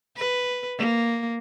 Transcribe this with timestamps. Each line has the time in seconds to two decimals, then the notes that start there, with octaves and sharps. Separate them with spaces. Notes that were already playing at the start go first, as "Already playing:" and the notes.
0.16 B4
0.78 A#3